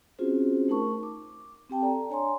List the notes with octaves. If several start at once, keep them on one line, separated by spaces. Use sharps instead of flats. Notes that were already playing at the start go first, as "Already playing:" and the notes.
C4 C#4 F4 F#4 G#4 C5
A3 D#4 A#4 A5 C#6
D6
C4 G4 G5 A5
A4 D5 A#5
D4 C#5 G#5 A#5 C6